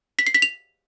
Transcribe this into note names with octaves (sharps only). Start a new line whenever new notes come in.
B6
C7
B6
F7